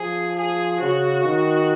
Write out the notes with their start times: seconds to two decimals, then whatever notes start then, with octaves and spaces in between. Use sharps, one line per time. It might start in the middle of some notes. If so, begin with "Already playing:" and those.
Already playing: F3 G#4
0.36 G#4
0.81 C#3 F#4
1.25 D#3